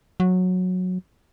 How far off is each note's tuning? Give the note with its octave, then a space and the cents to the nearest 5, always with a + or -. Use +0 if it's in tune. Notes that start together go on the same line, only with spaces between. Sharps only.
F#3 -15